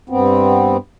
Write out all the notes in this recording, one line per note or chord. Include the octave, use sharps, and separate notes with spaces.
G2 B3 C4